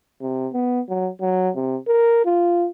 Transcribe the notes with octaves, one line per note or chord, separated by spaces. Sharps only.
C3
B3
F#3
F#3
C3
A#4
F4